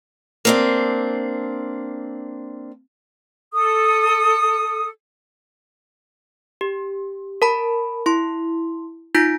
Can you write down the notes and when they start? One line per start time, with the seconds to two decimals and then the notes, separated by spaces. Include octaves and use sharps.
0.45 A#3 C4 D4
3.53 A4 D#6
6.61 G4
7.42 A#4 A5 B5
8.06 E4 C6
9.14 D#4 F4 G6 A#6 B6 D7